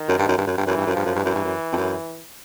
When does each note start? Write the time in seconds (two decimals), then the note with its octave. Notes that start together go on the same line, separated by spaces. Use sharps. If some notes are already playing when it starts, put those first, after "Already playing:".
Already playing: D#3
0.08 F#2
0.18 G2
0.28 F#2
0.37 G2
0.47 F#2
0.57 G2
0.65 F#2 E3
0.77 G2
0.86 F#2
0.92 G2 F3
1.05 F#2
1.15 G2
1.20 F#2 E3
1.35 G2
1.44 F#2
1.72 F2
1.77 F#2